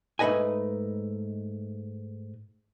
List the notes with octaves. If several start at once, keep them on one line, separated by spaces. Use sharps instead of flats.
G#2 A3 D#4 B4 D#5 G#5